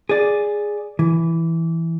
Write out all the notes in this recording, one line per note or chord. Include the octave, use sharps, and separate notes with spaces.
G#4 D5
E3